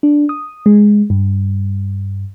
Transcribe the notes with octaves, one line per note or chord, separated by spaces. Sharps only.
D4
D#6
G#3
G2